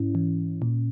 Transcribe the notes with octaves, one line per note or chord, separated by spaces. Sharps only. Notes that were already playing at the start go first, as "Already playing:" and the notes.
Already playing: G#2 C#4 E4
E3
A#2